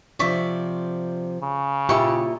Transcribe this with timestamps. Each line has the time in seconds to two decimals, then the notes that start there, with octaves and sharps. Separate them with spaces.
0.19 C3 F3 D5 E5 C#6
1.42 C#3
1.89 A#2 E4 G4 C#6